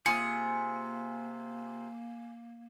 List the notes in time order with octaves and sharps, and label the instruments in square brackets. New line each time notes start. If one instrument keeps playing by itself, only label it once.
[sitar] C3 F4 [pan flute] A#3 [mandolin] G#4 [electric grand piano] C#7